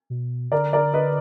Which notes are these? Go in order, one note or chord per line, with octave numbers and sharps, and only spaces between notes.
B2
D3 A#4 D5
A#4 D5
B4 D#5